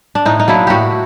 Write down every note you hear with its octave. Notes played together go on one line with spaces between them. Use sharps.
D4
A2 D#4
D#4
F#3 A#3 D4 E4
A2 F#4 G4